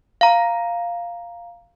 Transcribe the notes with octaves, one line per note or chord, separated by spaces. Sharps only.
F5 A#5